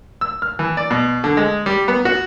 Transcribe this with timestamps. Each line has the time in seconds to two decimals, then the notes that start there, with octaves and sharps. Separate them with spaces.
0.21 E6
0.42 F6
0.59 E3
0.77 D5
0.91 B2
1.24 D3
1.37 G#3
1.66 G3
1.88 B3
2.05 F#4